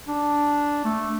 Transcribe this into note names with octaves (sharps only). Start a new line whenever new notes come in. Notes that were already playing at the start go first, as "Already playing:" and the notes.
D4
A3